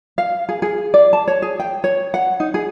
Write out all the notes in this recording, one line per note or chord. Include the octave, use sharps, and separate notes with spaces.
F5
G#4
G#4
D5
A5
C#5
G#4
G5
C#5
F#5
D#4
G#4